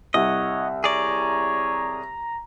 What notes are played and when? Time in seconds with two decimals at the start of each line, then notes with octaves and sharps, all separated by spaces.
0.14 C2 C#5 D#5 F#5
0.84 G#4 C#5 D5 A#5